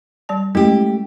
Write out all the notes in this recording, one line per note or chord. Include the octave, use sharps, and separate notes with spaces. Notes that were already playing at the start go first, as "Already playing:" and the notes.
G3 D5 A5
G#3 A3 C#4 E4 G4